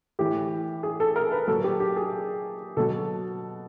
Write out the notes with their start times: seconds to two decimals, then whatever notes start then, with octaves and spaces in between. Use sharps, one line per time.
0.19 A2 E3 G4
0.83 G#4
1.00 A4
1.16 A#4
1.32 B4
1.48 A#2 F#3 A4
1.64 G4
1.80 G4
1.96 G#4
2.77 B2 F#3 A4